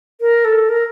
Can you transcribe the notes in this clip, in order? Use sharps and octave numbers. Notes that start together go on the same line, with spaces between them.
A#4
A4
A#4